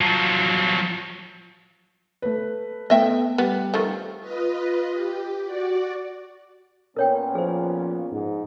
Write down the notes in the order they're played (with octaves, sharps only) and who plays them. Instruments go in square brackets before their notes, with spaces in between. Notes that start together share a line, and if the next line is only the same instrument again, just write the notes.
[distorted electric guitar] F3 F#3
[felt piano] A3 B4
[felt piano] A3 B3 [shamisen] D#5 E5 G5
[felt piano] G3 [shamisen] B3
[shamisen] D#3 F3 A3
[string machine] F4 B4 D#5
G4
F#4 D5
[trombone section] A#2 B3 C#4 [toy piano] A#4 C#5 G5
[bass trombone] F3 [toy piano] G#4 C5
[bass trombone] G#2